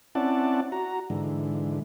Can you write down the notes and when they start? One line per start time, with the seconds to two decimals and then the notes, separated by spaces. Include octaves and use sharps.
0.15 C4 C#4 E4 D5 F#5 A5
0.72 F#4 A#5
1.10 G#2 D3 E3